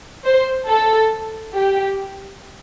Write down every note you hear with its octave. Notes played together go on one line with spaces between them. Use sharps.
C5
A4
G4